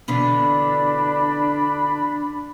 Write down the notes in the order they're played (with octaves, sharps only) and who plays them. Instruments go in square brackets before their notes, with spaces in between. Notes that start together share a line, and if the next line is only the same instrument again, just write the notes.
[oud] B2 D3 E3 [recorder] D4 [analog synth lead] B5